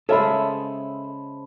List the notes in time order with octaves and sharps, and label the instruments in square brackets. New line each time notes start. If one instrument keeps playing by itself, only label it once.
[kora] C#3 G#3 [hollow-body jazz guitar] A4 E5 [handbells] C5 A5 B5